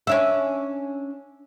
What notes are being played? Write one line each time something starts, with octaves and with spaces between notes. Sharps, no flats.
C#4 D4 E5